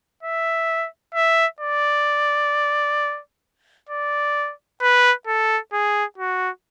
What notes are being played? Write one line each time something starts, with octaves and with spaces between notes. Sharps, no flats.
E5
E5
D5
D5
B4
A4
G#4
F#4